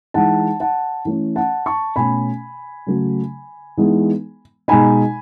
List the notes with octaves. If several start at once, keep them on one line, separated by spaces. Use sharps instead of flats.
E3 G#3 D#4 F#5 A5
F#5 A5
E3 A3 C#4
F#5 A5
A5 C#6
B2 A3 C#4 G#5 B5
C#3 F#3 A3
E3 G#3 B3 D#4
B2 G#3 D#4 G#5 B5